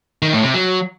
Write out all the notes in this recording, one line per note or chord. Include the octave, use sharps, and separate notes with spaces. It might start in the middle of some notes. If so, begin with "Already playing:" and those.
D#3
A2
C3
F#3